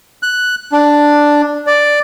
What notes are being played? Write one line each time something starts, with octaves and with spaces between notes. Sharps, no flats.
F#6
D4
D5